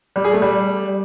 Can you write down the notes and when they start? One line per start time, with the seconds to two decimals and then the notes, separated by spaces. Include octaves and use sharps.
0.16 G3
0.24 G#4
0.33 A3
0.42 G3